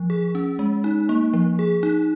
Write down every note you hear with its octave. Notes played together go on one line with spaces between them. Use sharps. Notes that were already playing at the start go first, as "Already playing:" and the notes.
Already playing: F3
G#4
C#4
G#3
D#4
A#3
F3
G#4
D#4